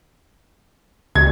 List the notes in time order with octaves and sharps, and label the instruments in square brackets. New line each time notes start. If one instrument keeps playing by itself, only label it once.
[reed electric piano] C#2 [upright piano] G#6